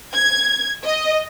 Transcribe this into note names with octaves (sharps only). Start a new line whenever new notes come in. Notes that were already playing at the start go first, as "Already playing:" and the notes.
G#6
D#5